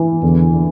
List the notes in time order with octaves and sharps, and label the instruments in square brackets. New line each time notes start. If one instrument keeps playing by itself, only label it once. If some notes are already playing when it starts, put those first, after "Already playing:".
Already playing: [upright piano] E3
[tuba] E2 [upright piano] D3
[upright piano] D3